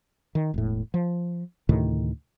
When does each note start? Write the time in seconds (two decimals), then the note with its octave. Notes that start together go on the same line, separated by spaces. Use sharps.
0.35 D#3
0.54 E1 A2
0.94 F3
1.69 D2 A2 C3 D#3